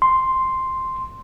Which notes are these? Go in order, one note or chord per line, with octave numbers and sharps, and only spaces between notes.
C6